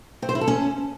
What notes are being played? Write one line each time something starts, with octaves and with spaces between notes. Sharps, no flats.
C4
C5
E4
A4
C#4